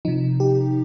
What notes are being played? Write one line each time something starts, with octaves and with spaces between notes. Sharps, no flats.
C3 F3 D#4
G4